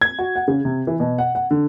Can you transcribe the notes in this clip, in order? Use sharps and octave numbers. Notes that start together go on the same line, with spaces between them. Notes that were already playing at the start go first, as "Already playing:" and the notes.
G#6
F#4
F#5
C#3
C3
E3
B2
F#5
F#5
D3